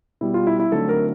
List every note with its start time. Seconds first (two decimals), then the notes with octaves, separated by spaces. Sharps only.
0.21 B2 G3 B3 E4
0.34 F4
0.47 E4
0.60 E4
0.72 D3 F#3 A3 C4 D#4 A4
0.89 A#4